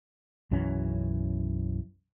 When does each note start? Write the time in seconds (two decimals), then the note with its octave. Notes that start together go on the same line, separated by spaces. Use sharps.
0.51 B1 F#2 E3 C#4